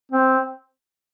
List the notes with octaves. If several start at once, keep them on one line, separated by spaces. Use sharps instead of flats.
C4